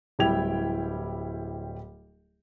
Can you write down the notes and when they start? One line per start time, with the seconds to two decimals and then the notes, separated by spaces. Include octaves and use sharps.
0.19 D1 G3 E4 G5 G#6 F7